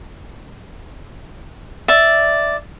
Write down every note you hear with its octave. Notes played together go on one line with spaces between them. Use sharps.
D5 E5